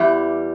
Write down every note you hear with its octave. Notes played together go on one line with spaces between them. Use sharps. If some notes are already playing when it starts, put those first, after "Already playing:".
Already playing: E2 E3 G3